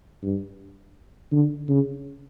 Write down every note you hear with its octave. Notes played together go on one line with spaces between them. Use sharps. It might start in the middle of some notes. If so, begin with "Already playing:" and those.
G2
D3
C#3